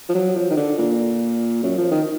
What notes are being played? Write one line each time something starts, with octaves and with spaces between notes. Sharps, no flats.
F3
F#3
F3
D#3
D3
A#2
F#2
F3
D#3